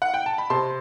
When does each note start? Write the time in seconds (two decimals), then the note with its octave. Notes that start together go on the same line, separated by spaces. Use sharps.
0.02 F#5
0.14 G5
0.26 A5
0.38 B5
0.50 C3 A5 C6